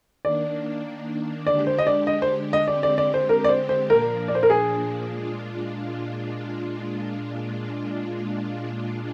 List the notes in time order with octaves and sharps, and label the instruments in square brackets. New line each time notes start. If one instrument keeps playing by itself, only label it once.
[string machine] D#3 A#3 D4 [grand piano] D5
[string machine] D3 G#3 D4 G4 [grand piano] D5
[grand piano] C5
D#5
D5
D#5
C5
D#5
[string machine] D3 G#3 C4 G4 [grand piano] D5
[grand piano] D5
D5
C5
A#4
D5
C5
C5
[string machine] A#2 F3 A#3 D4 [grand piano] A#4
[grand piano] D5
C5
A#4
G#4
[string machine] A#2 G#3 D4 F4